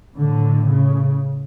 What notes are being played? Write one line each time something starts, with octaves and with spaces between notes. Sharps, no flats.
A2 D3
C#3